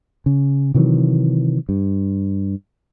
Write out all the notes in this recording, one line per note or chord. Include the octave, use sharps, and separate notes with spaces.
C#3
C3 D#3 E3 F#3
G2